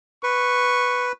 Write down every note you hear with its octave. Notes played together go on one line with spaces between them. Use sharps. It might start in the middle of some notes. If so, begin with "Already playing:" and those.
B4 C#6